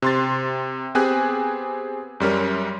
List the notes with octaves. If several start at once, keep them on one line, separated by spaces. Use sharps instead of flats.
C3 C6 A6
B3 C4 G4 G#4 G#5 F#6
F#2 G3 C#4 A#4